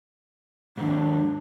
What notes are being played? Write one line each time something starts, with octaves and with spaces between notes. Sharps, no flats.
D#2 G#2 D4